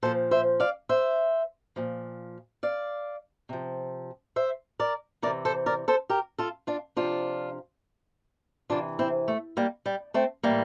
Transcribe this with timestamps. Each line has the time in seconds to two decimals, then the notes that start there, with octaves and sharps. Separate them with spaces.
0.02 A#2 F3 A4 C5
0.31 C5 E5
0.60 D5 F5
0.89 C5 E5
1.76 A#2 F3
2.63 D5 F5
3.49 C3 F3
4.36 C5 E5
4.79 A#4 D5
5.22 E3 A#4 D5
5.27 C3
5.45 A4 C5
5.66 A#4 D5
5.88 A4 C5
6.09 G4 A#4
6.38 F4 A4
6.67 D4 F4
6.96 C3 F3 D4 F4
8.70 C3 E3 D4 F4
8.99 C4 E4
9.28 A3
9.57 G3 A#3
9.86 G3
10.14 A3 C4
10.43 A2 E3 G3 A#3